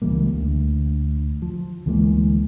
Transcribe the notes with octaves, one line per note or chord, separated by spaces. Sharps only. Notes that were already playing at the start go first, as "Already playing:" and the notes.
C#2 E3 G3 A#3
D2
F3
D2 E3 G#3 A#3